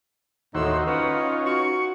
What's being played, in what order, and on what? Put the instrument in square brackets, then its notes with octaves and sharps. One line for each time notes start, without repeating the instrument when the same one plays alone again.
[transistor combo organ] D#2 F#4 C5 [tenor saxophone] A2 [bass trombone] D#4 [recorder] E6
[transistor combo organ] C#4 F4 [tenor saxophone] B4 [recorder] F#5
[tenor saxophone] F#4 [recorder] C#6